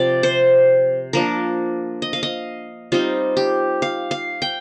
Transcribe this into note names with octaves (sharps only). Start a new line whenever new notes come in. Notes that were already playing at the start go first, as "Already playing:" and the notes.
Already playing: C3 F3 C4 D5
C5
F3 A#3 D4 A#4
D#5
F5
D#5
G3 C4 D#4 F4
G4
F5
F5
G5